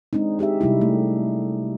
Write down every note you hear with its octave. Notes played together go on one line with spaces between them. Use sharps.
G#3 C4 D4 D#4
D#4 G4 G#4 E5
C3 G3 D#4 E4
A3